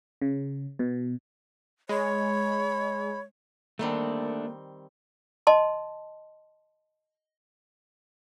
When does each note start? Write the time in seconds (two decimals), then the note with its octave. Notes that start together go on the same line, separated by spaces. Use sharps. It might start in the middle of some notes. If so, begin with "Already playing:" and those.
0.22 C#3
0.79 B2
1.89 G#3 C#5 B5
3.79 D#3 G3 A3 A#3 C4 D4
5.47 D#5 A5 C6